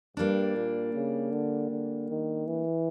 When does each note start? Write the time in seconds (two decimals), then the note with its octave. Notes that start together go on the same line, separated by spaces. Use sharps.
0.17 G2 G3 A#3 D4
0.55 A#2
0.94 C#3
1.32 D3
1.71 D3
2.10 D#3
2.47 E3